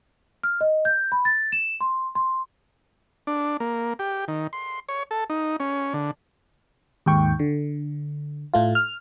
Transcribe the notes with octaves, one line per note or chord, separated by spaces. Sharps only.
F6
D#5
G6
B5
A6
E7
C6
C6
D4
A#3
G4
D#3
C6
C#5
A4
D#4
C#4
D3
D#2 G#2 G5 C#6
D3
A2 A3 F4
F6